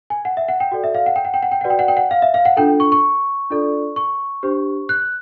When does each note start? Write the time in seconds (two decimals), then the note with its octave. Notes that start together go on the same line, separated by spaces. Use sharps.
0.10 G#5
0.25 F#5
0.37 E5
0.48 F#5
0.60 G5
0.72 F#4 A4 D5
0.84 E5
0.94 F5
1.06 F#5
1.16 G5
1.25 F#5
1.34 G5
1.43 F#5
1.52 G5
1.61 F#4 B4 D5 F#5
1.70 G5
1.79 F#5
1.88 G5
1.97 F#5
2.11 F5
2.22 E5
2.34 F5
2.45 F#5
2.57 D4 F4 A4 G5
2.80 C#6
2.92 C#6
3.50 D4 F4 A4 D5
3.96 C#6
4.43 D4 G4 C5
4.89 F#6